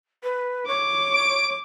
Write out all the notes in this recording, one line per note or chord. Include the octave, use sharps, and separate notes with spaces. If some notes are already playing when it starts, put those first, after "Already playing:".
B4
C#5 D6
D7